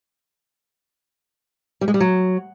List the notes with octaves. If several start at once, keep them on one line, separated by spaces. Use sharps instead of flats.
G3
G#3
G3
F#3